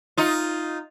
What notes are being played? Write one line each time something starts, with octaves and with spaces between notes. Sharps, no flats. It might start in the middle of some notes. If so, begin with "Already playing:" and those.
D#4 F4